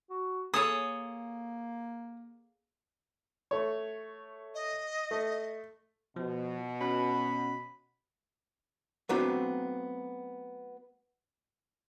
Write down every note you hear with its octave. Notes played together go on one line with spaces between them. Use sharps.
F#4
A#3 G#4 A4 C#5 D#6
A3 C#5
D#5
A3
B2 F3
C#4 F#4 F#5 B5
F#3 A3 B3 C4 D4 F4